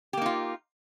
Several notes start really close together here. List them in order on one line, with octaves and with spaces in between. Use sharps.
G4 A#3 D#4 F4